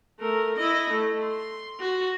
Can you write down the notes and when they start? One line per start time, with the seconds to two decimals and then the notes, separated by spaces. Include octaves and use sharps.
0.19 A3 A#4
0.57 E4 D#5
0.91 A3
1.22 C6
1.80 F#4